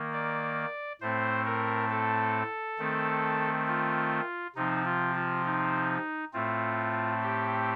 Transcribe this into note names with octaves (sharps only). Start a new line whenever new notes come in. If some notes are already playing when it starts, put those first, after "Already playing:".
Already playing: D#3 A#3
D5
A2 A3 C4 C5
A#4
A4
D#3 A3 C4
F4
C3 F3 C4 D#4
F4
F4
D#4
A2 A3 C4 F4
G4